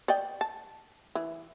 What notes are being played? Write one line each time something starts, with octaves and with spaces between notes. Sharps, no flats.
D5 D#5 G5
A5
E3